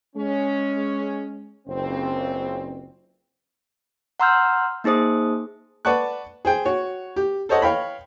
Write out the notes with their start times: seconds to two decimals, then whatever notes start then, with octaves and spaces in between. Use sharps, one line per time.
0.16 G#3 C#4
1.67 F#1 C#2 C4
4.20 F#5 A#5 C6 E6 F6 G6
4.84 A#3 D#4 G#4 C5 D#6
5.85 B4 D5 F#5 A5 C#6 F#6
6.45 G#4 C5 G5
6.65 F#4 C#5
7.16 G4
7.49 A4 C5 C#5 D#5 F#5 A5
7.62 C#5 F5 G5 B5